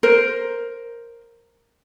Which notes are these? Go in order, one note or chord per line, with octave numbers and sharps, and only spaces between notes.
A#4 C5